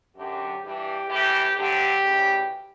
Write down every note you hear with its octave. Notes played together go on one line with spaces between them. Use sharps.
F#2 D3 F#3 G4
G2 E3 G4
A2 E3 G4
D2 D3 F#3 G4
D2 C#3 E3